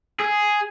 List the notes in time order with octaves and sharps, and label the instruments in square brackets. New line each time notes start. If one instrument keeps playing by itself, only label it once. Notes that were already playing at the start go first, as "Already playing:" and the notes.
[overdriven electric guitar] G#4